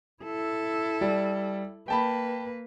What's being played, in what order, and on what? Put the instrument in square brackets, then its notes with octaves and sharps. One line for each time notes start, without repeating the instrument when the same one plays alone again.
[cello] E4 A4
[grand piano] G3
[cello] A#3 B4 [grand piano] G5 A5 B5